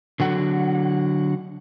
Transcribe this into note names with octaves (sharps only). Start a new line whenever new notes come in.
D3 F#3 F#5